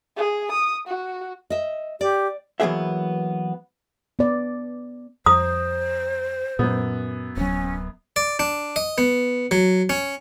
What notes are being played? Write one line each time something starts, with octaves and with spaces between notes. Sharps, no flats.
G#4
D#6
F#4
D#5 E5
G4 D5
E3 F#3 A#3 B3 G#4 E5
B3 D5
F2 C5 A#5 D#6
F#2 A#2 B3
D1 F#3 C#4
D5
D4
D#5
B3
F#3
C#4